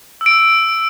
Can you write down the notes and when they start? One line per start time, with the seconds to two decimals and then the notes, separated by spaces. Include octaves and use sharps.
0.21 E6
0.26 D7
0.31 E6